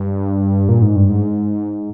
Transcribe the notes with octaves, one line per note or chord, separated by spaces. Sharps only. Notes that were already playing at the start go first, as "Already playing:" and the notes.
Already playing: G2
A#2
G#2
G2
G#2